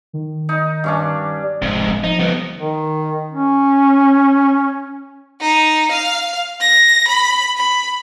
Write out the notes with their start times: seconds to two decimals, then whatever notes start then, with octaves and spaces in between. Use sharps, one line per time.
0.13 D#3
0.49 D#4
0.84 G2 C#4 D4
1.62 F1 F2 G#2
2.04 F3 D#4
2.20 G3 B3
2.59 D#3
3.32 C#4
5.40 D#4
5.92 F5
6.60 A#6
7.07 B5
7.57 B5